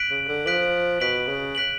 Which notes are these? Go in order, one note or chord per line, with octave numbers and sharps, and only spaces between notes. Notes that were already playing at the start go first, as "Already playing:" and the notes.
Already playing: F#6 B6 D7 F#7
C#3
D3
F3 F#6 B6 D7 F#7
B2 F#6 B6 D7 F#7
C#3
F#6 B6 D7 F#7